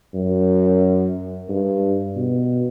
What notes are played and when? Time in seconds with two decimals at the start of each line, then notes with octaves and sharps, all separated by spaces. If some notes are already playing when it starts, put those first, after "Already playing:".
0.14 F#2
1.49 G2
2.16 B2